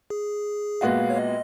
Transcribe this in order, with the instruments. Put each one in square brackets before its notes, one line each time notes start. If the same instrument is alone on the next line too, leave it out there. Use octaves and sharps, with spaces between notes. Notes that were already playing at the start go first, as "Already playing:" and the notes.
[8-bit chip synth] G#4
[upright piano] A#1 A#2 G#3 B3 F#4 [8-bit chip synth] F5
[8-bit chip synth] C#5
D#5